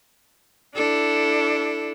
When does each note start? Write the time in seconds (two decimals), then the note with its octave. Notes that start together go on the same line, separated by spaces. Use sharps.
0.75 D4 E4 A4